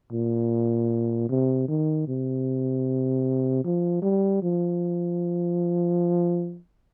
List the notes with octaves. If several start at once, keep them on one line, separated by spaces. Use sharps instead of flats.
A#2
C3
D#3
C3
F3
G3
F3